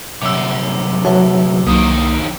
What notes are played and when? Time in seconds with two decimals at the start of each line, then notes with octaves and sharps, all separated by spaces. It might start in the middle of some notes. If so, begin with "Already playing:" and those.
0.21 C2 F#2 D6 E6
1.05 F#3 B4 E5 A5
1.66 C2 F2 D#3 A#3 D#6